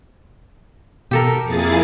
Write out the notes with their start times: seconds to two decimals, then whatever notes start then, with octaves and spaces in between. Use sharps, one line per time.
1.11 B2 G4 A4 A#4
1.44 F2 A#3 E4 G#4 A6